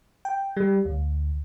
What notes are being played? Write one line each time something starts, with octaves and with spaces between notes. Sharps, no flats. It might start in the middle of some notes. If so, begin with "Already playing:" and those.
G5
G3
D2